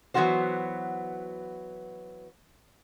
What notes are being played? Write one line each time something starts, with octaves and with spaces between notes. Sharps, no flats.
E3 F#3 B3 F4 F#4 C5